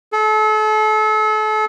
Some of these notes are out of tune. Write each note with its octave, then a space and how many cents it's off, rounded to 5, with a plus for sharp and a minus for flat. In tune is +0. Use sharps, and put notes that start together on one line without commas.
A4 -35